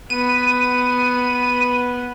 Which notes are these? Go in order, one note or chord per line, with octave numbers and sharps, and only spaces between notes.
B3 D#7